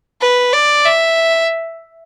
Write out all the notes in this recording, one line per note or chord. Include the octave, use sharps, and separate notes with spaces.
B4
D5
E5